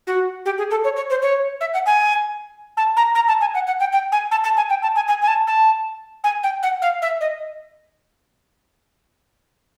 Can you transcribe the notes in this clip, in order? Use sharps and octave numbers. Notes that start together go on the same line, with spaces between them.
F#4
G4
G#4
A4
C#5
C#5
C5
C#5
E5
F#5
G#5
A5
A#5
A#5
A5
G#5
F#5
F#5
G5
G5
G#5
A5
A5
G#5
G5
A5
G#5
G#5
G#5
A5
A5
G#5
G5
F#5
F5
E5
D#5